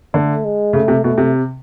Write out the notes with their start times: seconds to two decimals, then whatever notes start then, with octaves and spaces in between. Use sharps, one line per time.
0.14 D3 A3
0.45 G#3
0.73 C#3 A3
0.88 C3
1.04 B2 A3
1.18 C3